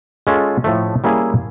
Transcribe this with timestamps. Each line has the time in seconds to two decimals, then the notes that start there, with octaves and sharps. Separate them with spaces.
0.27 G#3 C#4 F4 A4
0.64 A2 F3 A3
1.04 G3 A#3 C#4 E4 G#4